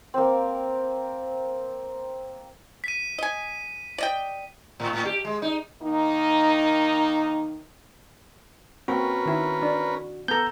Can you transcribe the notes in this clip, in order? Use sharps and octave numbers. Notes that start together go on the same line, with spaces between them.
A#3 C4
B6 D#7
D#5 G#5
D5 D#5 G5
A2
A2
G4
G#3
D#4
D#3 A#3 D#4
A#3 C4 C#4 F#4 A#4 B4
D#3 E4
D4
B3 A4 A#5 G6